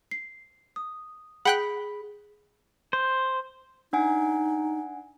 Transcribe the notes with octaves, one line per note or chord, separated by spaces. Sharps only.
C7
D#6
G#4 F#5 G5 B5 F#6 B6
C5
D4 D#4 F#5 G#5